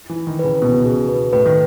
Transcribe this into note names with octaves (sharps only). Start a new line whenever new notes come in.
E3
E4
D#3
C#3 B4
B2 B3
C#3
B2 G#4
B4
A2 B4
D#3